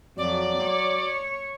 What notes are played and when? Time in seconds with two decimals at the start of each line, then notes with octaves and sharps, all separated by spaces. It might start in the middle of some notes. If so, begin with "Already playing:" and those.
0.18 F2 F#3 D5
0.63 C#5